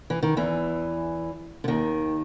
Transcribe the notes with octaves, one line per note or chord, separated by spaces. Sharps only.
E3
D#3
E2 E3
D3
D#2 D#3